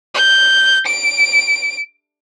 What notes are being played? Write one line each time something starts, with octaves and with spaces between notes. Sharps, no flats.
G6
D7